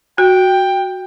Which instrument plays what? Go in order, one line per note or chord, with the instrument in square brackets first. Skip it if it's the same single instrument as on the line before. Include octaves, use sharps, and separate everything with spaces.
[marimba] F#4 [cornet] G5